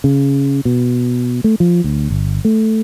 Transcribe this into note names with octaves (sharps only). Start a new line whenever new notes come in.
C#3
B2
A3
F3
D2
G1
A3